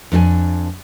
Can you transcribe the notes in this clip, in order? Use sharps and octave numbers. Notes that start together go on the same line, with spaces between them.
F2 D4 A4 G#5